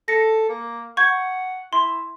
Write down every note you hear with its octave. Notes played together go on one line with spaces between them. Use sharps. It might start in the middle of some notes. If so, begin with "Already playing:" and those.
A4 A#6 C#7
A#3
F#5 C#6 G6 G#6
E4 C6